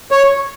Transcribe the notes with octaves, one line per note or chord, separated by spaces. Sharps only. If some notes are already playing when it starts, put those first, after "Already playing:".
C#5